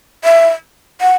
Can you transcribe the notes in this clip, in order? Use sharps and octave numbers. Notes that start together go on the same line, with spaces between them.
E5
F#5